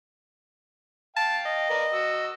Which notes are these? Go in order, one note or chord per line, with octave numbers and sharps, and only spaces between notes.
F5 G5 A5
D#5
A#4 B4 D5
F#4 E6